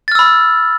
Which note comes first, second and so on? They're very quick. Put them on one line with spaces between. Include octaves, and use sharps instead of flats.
A6 F6 E6 B5